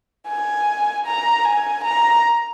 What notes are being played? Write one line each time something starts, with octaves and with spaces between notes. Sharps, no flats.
G#5
A#5
G#5
A#5